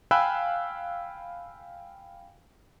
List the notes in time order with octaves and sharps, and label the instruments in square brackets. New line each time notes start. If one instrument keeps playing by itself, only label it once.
[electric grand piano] F5 G5 G#5 B5 E6 F#6